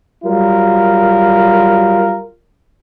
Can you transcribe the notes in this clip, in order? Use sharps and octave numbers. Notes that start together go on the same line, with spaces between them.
F#3 G3 F4 F#4 A#4